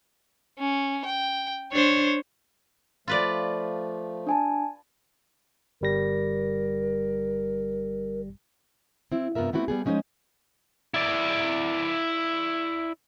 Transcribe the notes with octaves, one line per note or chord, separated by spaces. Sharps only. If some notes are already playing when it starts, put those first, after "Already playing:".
C#4
G5
D4 C5 C#5
F3 A3 F4 B4 D5
D4 G#5 A5
G1 G3 A#4 A#6
C4 E4
G2 C3 B3 F4 A#4 E5
A3 B3 C4 E4 F#4
G3 B3 G#4
F3 G#3 C#4 D#4 C5 D#5
E4 D5